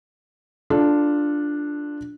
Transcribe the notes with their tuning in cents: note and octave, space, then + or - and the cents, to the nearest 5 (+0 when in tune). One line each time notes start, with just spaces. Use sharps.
D4 +0 F4 +0 A4 -20